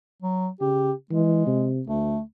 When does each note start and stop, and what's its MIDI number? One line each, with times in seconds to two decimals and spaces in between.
0.23 0.49 54
0.61 0.91 49
0.61 0.92 67
1.11 1.46 52
1.11 1.70 56
1.47 1.81 48
1.88 2.16 38
1.88 2.20 57